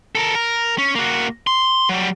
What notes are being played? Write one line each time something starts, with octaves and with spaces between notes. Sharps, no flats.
A4 A#4
A#4
C#4
A#3 F#4
C6
F#3 G3